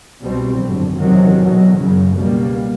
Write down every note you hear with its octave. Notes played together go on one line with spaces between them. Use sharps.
C2 B2 G3 C4
G#1 F#2 D3
E2 C3 D#3 F#3
E2 B2 F#3
F#1 F#2 C#3
C#2 B2 G3 A#3